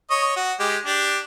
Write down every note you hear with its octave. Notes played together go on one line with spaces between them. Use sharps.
C#5 D#5
F#4
G#3 G4
D4 G4